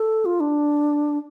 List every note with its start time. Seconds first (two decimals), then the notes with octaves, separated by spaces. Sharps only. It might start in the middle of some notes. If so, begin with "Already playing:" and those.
Already playing: A4
0.25 F4
0.40 D4